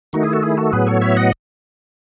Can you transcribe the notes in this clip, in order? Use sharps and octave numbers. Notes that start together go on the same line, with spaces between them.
D#3 A3 D#4 F#4
E4 G#4
F#4 A4
E4 G#4
F#4 A4
A2 F#3 B3 G#4 B4
A4 C#5
C#5 E5
D#5 F#5